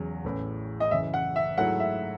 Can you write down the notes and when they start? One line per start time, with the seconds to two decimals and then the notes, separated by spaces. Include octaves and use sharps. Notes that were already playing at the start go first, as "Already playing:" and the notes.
Already playing: E2 C#3 F#3
0.24 A1 A2 E3
0.80 D#5
0.91 F#1 F#2 E3 E5
1.14 F#5
1.36 E5
1.58 G#2 F#3 A3 E4 F#5
1.80 E5